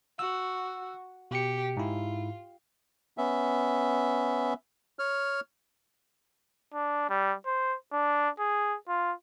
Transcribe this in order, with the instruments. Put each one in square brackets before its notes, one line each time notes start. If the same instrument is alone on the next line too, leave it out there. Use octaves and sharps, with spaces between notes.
[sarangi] F#4 [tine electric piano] E6
[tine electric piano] B2 C#7 [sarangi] G4
[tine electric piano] G#2 E4 [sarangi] F4
[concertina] B3 C#4 E5
C#5 F6
[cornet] D4
G3
C5
D4
G#4
F4